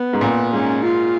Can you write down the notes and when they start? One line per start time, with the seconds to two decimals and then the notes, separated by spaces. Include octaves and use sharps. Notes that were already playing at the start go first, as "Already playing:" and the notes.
Already playing: B3
0.13 G#2
0.21 A#2
0.53 G#2 C#4
0.84 F4